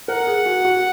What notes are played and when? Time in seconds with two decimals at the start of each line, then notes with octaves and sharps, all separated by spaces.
0.08 A#4 F#5
0.27 G#4
0.46 F#4
0.65 F#4